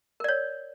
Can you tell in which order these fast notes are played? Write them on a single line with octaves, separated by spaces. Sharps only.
A#4 D5 C#5